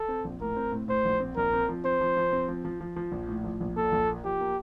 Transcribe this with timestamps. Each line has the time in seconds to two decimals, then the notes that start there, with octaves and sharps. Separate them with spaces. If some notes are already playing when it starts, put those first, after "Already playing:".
Already playing: A4
0.09 C4
0.25 A#1
0.41 A2 A#4
0.56 C4
0.72 A2
0.88 A2 C5
1.05 A#1
1.20 C4
1.36 A#1 A#4
1.53 C4
1.69 F3
1.85 C4 C5
2.01 F3
2.17 F3
2.33 C4
2.48 F3
2.65 F3
2.81 F3
2.96 F3
3.12 A#1
3.29 A2
3.44 F3
3.60 A#1
3.77 A#2 A4
3.92 A#1
4.09 A#3
4.24 F3 G4
4.40 A#3